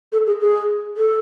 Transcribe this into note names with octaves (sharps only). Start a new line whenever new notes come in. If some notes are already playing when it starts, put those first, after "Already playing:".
A4
G#4
G#4
A4